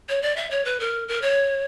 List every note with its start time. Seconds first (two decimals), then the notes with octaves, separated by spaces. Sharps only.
0.09 C#5
0.22 D5
0.36 E5
0.51 C#5
0.65 B4
0.80 A#4
1.08 A#4
1.22 C#5